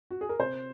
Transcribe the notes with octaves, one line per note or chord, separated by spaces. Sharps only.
F#4
G#4
A#4
C3 C5